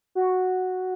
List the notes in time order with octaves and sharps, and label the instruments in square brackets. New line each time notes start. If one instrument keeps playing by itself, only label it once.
[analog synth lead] F#4